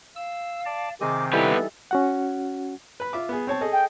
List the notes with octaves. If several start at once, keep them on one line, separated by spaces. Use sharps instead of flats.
F5 E6
D5 A5
C3 D#3 C4 G#4 D#5 D6
E3 G3 B3 D#4 G4 A4 B4
C#4 F#4 F#5
B4 B5
F4 E5 D6
B3 G#4
C4 C#5 A5
G#4 A4 D#5
G5